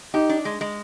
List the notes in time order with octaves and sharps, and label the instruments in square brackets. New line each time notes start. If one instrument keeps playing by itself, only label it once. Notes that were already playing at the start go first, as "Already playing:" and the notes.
[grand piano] D#4 [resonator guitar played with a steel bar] G4
[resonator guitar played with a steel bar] D4
G#3
G#3